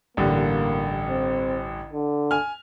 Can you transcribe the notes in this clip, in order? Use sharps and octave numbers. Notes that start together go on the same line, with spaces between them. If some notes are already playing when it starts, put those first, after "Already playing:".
A1 G2 D3 A#3
C4
D3
G#5 F6